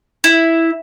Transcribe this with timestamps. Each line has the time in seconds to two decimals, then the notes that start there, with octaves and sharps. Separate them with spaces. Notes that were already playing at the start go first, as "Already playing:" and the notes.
0.24 E4